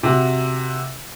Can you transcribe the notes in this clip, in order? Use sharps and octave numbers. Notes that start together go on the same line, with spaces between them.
C3 F#4